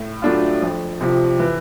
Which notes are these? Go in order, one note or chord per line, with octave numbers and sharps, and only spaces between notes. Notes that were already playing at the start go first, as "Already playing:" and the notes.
Already playing: A2
F#3 A3 D4 F4
F2
C3 F3
E3